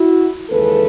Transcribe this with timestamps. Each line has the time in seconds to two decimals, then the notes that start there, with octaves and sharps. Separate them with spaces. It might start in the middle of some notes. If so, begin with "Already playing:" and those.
Already playing: E4 F#4
0.50 D#2 C#3 E3 G#3 A4 B4